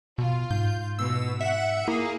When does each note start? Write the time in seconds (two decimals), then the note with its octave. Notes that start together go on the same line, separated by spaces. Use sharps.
0.18 B2 F4
0.50 G#2 G6
0.99 B2 E6
1.41 E5 F#5
1.88 A#3 E4 G#4